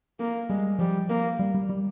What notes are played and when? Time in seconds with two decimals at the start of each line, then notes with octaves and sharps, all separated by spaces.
0.20 A#3
0.49 G3 G#3
0.79 F3 G3
1.10 A#3
1.39 G3
1.54 G3
1.70 G3